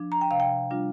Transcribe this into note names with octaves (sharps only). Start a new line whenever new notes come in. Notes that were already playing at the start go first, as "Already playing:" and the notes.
Already playing: F3 D4
A#5
G5
C3 F5
G5
G3 D4 F4